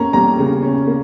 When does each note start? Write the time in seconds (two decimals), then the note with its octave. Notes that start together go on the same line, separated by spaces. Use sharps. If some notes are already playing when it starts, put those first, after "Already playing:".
Already playing: A#3 C#4 A#5
0.13 G3 A#5
0.39 C#3
0.62 C#4
0.87 A#3